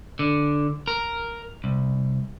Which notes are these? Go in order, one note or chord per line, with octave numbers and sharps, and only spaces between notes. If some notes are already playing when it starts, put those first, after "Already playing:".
D3
A#4
C2